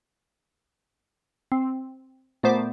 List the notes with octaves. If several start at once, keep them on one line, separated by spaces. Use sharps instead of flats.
C4
A#2 A3 B3 C5 D6